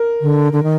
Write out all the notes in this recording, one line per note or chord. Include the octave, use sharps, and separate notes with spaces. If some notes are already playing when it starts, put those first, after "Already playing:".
Already playing: A#4
D3
D3
D#3